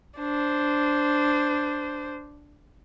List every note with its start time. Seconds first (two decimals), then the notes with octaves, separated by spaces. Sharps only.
0.18 D4 C5